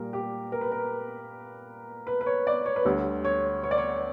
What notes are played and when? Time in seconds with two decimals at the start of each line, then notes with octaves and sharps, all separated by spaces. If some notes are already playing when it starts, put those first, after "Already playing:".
Already playing: A#2 G3 A#4
0.13 G4
0.52 A#4
0.61 B4
0.72 A#4
2.07 B4
2.21 B4
2.26 C#5
2.47 D5
2.66 C#5
2.76 B4
2.84 D2 D3 G3 C#5
3.25 C#5
3.64 C#5
3.71 D5
3.78 C#5